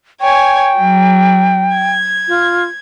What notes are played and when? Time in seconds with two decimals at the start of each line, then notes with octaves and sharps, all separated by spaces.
0.21 C#5 G5 G#5
0.78 F#3
1.74 G#6
2.28 F4